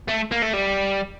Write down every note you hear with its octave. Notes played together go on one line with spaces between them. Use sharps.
A3
A#3
A3
G3